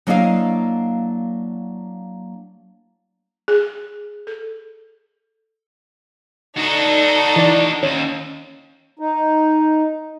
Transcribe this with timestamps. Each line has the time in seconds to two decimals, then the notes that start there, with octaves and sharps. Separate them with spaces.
0.07 F#3 A#3 D4 E4 D#5 F5
3.48 G#4
4.27 A4
6.57 D4 D#4 F#4 A4
7.36 E3 D5
7.83 D#2 C#4
8.99 D#4